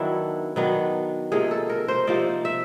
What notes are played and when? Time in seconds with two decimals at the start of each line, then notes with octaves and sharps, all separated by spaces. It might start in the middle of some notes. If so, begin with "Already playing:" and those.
Already playing: D#3 F#3 B3 D4 E4
0.56 D#3 F#3 B3 D4
1.32 C3 F3 A#3 D#4 G#4
1.51 A4
1.70 A#4
1.88 C5
2.07 C3 F3 A#3 D#4 D5
2.45 E5